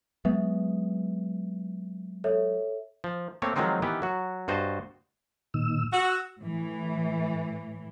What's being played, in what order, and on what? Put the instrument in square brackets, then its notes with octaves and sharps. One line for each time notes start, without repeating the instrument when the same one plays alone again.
[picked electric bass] F#3 G#3 B3 [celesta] E5
[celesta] A4 C#5 E5
[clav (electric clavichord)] F3
A3 A#3 C4 C#5
D#3 F3 F#3 G#3 C4 D#4
D#3 E3 B3 G4
F#3 F#4
G2 F#4 C5 D#5 A5
[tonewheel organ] A#2 D#3 E6
[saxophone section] F#4 [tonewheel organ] E6
[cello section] A2 E3